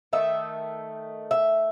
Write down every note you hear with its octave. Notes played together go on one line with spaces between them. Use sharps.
D#3 A3 D#4 E5
E5